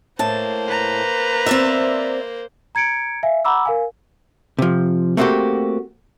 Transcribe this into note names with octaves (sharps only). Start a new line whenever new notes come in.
A2 A#3 C5 A5
B4 A#5
C4 D5 E5
A#5 G#6 C#7 D7
E5 F5 G#5
F#5 A#5 B5 D6 E6
A#4 F5 G#5
C3 F3
A3 A#3 C4 D4 F#4 G4